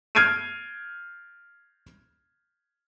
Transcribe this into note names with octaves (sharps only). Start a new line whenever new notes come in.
F6 G6 G#6 C7 D7 D#7